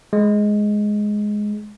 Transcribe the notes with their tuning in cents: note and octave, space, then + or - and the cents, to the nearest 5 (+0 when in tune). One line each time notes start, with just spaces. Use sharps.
G#3 +5